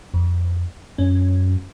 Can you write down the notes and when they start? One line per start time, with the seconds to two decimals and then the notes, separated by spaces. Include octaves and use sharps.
0.14 F2
0.98 F#2 C#4